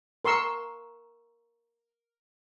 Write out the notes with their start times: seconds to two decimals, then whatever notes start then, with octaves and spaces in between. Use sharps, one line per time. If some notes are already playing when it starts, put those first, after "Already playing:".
0.25 A#4 C6 C#6 E6